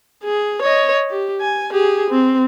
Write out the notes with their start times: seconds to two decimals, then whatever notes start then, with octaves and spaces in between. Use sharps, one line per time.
0.23 G#4
0.62 C#5 D#5
1.10 G4
1.41 G#5
1.71 G4 G#4
2.10 C4